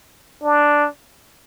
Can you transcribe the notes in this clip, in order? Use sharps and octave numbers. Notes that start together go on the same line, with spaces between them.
D4